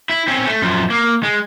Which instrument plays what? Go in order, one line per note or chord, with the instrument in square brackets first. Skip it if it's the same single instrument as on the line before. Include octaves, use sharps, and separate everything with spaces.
[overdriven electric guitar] E4
C4 C#4
A3
F#2 F3
A#3
G#3